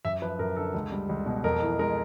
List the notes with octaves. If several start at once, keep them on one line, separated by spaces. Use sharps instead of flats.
F#2 E5
F3 B4
F#2 A#4
D3 A4
C#2
G3
C#2
B2
F2 A#4
E3
G#3 A#4